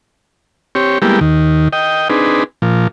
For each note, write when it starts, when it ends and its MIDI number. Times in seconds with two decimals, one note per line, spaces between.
0.75 0.98 60
0.75 0.98 67
0.75 0.98 73
1.02 1.20 55
1.02 1.20 56
1.02 1.20 58
1.02 1.20 59
1.02 1.20 64
1.02 1.20 67
1.21 1.68 39
1.21 1.68 51
1.73 2.08 75
1.73 2.08 79
2.10 2.44 60
2.10 2.44 62
2.10 2.44 63
2.10 2.44 68
2.10 2.44 71
2.62 2.87 46
2.62 2.87 53